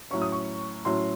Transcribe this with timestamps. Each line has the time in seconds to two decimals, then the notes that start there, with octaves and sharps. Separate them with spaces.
0.11 A2 F#3 C#4 C#6
0.22 D#6
0.32 C#6
0.85 A2 F#3 C#4 C6